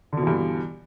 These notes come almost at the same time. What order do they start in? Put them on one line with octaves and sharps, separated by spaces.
D3 B2 E3 G2